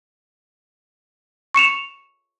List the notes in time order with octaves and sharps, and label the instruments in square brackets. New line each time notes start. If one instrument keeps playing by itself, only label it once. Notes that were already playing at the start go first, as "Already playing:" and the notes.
[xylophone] C#6 C#7 E7 F7